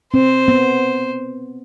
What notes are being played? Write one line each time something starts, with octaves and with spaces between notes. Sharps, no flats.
C4 C5
B3